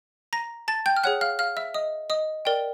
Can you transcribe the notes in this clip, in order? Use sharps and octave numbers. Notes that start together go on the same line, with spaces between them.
A#5 A#6
A5 A6
G5 G6
F6
G#4 C#5 F#5 F#6
F5 F6
F5 F6
E5 E6
D#5 D#6
D#5 D#6
A#4 D5 G5